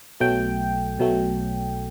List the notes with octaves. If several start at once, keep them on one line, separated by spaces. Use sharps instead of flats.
B1 B2 F#3 A3 G5
B1 B2 F#3 A3